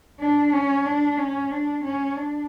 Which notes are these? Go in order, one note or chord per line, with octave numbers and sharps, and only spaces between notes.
D4
C#4
D4
C#4
D4
C#4
D4